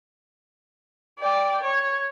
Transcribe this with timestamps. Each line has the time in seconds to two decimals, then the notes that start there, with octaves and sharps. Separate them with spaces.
1.19 D5 G5
1.62 C#5